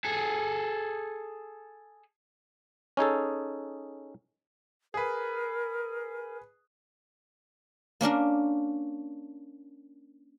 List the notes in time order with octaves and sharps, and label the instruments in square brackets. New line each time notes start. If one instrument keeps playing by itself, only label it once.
[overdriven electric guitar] G#4 A4
[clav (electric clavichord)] C#4 D#4 G#4 A4
[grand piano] G#4 B4 [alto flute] A#4
[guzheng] A#3 C#4 D4 A#4